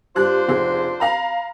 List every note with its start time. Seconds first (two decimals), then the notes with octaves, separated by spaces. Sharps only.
0.16 G2 D4 F4 C5 F#6
0.48 F1 G#4
1.00 F5 A#5 B5